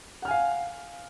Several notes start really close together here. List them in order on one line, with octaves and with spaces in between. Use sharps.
F#5 F6 G#5 F5